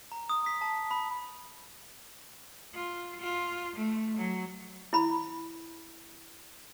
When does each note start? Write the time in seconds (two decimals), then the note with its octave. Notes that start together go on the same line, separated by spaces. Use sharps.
0.12 A#5
0.29 D#6
0.46 B6
0.61 A5
0.91 B5
2.74 F4
3.21 F4
3.76 A3
4.17 F#3
4.93 E4 B5